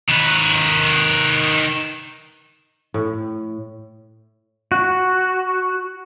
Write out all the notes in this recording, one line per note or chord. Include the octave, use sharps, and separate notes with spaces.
D#3 B4
A2
F#4